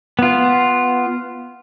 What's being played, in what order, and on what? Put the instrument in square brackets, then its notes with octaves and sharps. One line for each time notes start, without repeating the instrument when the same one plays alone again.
[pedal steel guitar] B3 F4